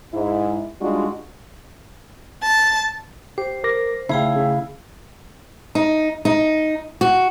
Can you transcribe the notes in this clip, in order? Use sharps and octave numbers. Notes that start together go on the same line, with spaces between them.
G#2 E4
G3 G#3 D4 D#4 F4 F#4
A5
G4 C5
A#4 D6 A#6
C#3 A3 E4 G#4 F5 G5
C#3
D#4
D#4
F#4